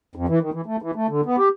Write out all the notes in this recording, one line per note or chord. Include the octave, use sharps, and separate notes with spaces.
F2
E3
D#3
E3
A3
E3
A3
D3
B3
G4